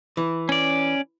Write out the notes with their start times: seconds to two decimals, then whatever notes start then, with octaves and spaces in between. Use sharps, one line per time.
0.17 E3
0.49 C#4 D5